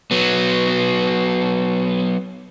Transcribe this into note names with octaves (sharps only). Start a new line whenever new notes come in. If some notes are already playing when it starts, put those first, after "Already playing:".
F#3 B3